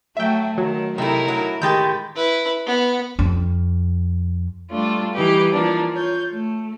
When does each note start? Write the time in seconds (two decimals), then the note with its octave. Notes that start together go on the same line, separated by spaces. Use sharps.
0.17 F#3 A3 E5 G5
0.58 D#3 F#3
0.98 C3 A3 D#4 E4 A#4
1.28 F#3
1.62 A2 D#3 G#3 G4 G6 A6
2.16 E4 B4
2.66 B3
3.19 F2
4.71 G3 A3 D4 F4
5.14 E3 G3 D#4 G4 B4
5.52 E3 F3 A#3 D4
5.92 F4 C#5 G6
6.31 A3